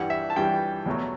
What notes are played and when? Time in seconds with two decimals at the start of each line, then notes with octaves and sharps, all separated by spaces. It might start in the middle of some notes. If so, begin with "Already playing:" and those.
Already playing: G2 E3 G3 F#5
0.10 E5
0.30 A5
0.36 G2 E3 G3 G5
0.86 E2 B2 F#3 A3